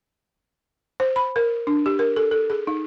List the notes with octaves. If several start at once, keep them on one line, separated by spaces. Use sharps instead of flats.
C5
B5
A#4
D4
G4
A#4
A4
A4
G#4
D#4